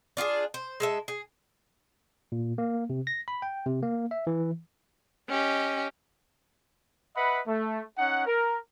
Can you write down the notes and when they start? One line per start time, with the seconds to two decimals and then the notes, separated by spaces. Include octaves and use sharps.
0.17 D4 F4 G4 G#4
0.54 C5
0.80 G#3 A4 E5
1.08 G#4
2.32 A#2
2.58 A#3
2.90 C3
3.07 A#6
3.28 B5
3.42 G5
3.66 C3
3.83 A#3
4.11 E5
4.27 E3
5.29 C#4 G4 D#5
7.16 B4 D#5 E5 F#5 B5
7.47 A3
7.98 C#4 D#4 F#5
8.26 A#4